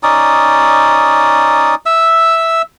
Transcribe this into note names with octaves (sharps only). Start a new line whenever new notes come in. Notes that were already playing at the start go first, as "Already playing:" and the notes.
C#4 D#4 D5 D#6
E5 E6